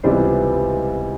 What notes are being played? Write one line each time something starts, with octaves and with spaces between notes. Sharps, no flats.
C#2 C3 E3 G3 B3 C5 D5